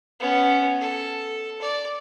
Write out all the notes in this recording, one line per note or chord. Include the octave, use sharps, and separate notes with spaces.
B3 C#4
A4
D5